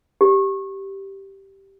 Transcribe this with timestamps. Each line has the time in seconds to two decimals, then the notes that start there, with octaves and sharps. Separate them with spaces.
0.21 G4